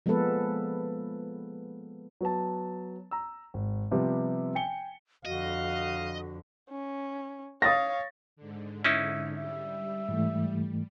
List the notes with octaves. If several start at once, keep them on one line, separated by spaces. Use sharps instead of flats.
F3 G#3 A#3 B3 A4 B4
F#3 B3 A5
A#5 E6
G#1
C3 F3 G3 B3
G5 G#5 C#7 G7
F2 D3 F#4 D#5 F5
C#4
C#5 F5 D#6 A6 A#6
G#2 D3
C#4 D#4 E4 E5
G3 E5
G#2 E3 A3